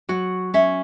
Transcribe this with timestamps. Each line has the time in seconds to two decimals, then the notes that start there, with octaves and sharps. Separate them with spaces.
0.09 F#3 F#4
0.54 C#4 E5